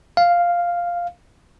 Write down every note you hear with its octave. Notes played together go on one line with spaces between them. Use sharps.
F5